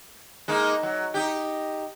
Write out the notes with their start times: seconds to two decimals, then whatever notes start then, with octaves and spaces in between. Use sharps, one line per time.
0.48 G#3 A#3 D#4
0.83 F#3
1.14 D#4 G4